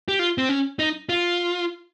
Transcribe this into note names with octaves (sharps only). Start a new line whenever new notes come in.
G4
F4
C4
C#4
D#4
F4